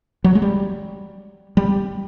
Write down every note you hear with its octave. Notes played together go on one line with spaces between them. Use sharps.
F#3
G#3
G3
G3